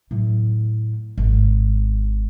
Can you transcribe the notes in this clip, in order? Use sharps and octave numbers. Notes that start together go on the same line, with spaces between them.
A2 F#3
G#1